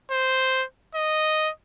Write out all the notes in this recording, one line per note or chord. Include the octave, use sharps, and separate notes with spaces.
C5
D#5